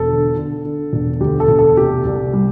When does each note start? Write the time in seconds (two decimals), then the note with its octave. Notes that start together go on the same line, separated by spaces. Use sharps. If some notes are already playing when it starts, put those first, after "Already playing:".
Already playing: E1 A4
0.09 D3
0.36 D3
0.65 D3
0.93 E1
1.20 D2 G4
1.40 A4
1.48 E1
1.59 A4
1.77 C3 G4
2.05 C2
2.33 G3